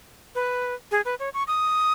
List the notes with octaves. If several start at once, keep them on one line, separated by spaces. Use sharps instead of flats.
B4
G#4
B4
C#5
C#6
D#6